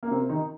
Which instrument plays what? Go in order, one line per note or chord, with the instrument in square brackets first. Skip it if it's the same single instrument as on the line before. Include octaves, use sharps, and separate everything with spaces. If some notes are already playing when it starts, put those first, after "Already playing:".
[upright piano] A#3
C3 C4
D#3 D#4